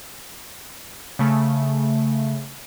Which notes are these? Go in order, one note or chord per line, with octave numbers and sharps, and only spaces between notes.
C#3 A3